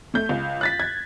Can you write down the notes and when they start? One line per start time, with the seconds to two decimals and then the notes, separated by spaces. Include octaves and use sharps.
0.14 A3 G6
0.29 C#2
0.61 F#6 A6 B6
0.80 G#6